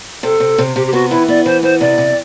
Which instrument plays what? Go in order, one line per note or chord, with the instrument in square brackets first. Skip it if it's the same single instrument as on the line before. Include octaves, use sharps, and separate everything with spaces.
[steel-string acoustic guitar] C3 [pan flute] A4
[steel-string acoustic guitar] C3
C3
[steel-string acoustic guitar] C3 [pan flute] G4
[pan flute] G4
[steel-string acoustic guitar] B3 [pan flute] F#4
[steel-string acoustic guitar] E3 [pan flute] E4
[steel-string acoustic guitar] B3 [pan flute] D5
[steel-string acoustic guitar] E3 [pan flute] C5
[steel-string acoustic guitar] B3 [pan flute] C5
[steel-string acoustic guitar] C3 [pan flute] D5
[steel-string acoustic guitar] C3